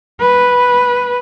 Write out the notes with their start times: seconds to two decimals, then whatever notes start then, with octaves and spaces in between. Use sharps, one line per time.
0.20 B4